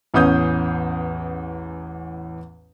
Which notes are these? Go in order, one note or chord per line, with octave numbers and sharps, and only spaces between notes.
A1 E2 C#4 D#6 G6